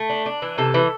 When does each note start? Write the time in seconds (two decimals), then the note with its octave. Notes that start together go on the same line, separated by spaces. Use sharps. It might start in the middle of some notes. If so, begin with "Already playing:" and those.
Already playing: A3
0.10 D4
0.26 D4
0.42 E3
0.58 C3 A4
0.74 E3